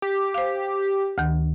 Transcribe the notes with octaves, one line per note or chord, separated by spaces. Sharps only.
G4
C5 F5
D2 D#3